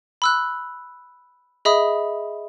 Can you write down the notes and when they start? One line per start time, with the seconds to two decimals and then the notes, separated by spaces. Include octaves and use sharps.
0.22 B5 E6 F#6
1.65 G#4 D#5 E5 B5 D#6